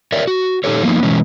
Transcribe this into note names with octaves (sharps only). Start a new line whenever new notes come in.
A#4 C#5 D5 E5
F#4
A#2 D#4 G4 A4 C#5
F3 F#3 A#3 B3 D#4
B2 E3 G#3 C#4